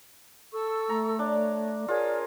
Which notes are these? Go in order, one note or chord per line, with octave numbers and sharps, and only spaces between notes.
A4 C#6 E6
A3 A#5
D4 C#5
F4 G#4 A#4 C#5 D5